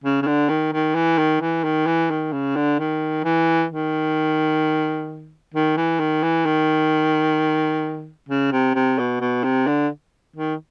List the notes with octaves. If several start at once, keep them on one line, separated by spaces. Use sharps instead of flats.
C#3
C#3
D3
D#3
D#3
E3
D#3
E3
D#3
E3
D#3
C#3
D3
D#3
E3
D#3
D#3
E3
D#3
E3
D#3
C#3
C3
C3
B2
B2
C3
D3
D#3